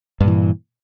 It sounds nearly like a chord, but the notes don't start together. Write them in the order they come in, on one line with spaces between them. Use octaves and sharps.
G2 A#2 E3